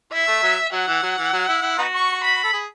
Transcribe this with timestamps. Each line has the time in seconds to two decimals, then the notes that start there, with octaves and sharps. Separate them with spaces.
0.13 E4 E5
0.28 A3
0.43 F#3
0.73 F#3 F#5
0.88 E3
1.03 F#3
1.18 E3
1.33 F#3
1.49 E4
1.63 E4
1.78 B3 D#4 F#4
1.93 C#6
2.24 B5
2.44 A4
2.53 G#4